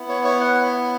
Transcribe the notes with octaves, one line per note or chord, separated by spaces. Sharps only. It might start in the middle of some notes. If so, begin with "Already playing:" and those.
Already playing: B3 E4
C#5
C#5
F#5